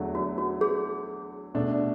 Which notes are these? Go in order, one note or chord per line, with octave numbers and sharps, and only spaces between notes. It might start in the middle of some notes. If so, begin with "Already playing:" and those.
Already playing: E2 D3 F#3 A3
F#4
F#4
G#4
B2 A3 D4